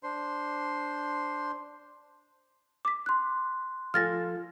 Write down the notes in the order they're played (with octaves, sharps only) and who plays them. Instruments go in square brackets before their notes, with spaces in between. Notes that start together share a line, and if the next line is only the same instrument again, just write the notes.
[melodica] D4 C5 C6
[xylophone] D6 B6
[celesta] C6 F#6
[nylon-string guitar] F3 A4 G#5 [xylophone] F6 A6 A#6